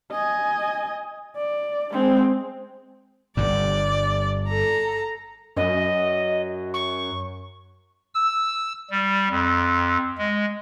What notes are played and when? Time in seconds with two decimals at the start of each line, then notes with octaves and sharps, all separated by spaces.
0.11 D#5 G#5
1.36 D5
1.93 G#3 C4
3.37 G1 G2 D5
4.48 A4 A#5
5.57 F#2 D#5
6.74 C#6
8.15 E6
8.90 G3
9.30 F2
10.18 G#3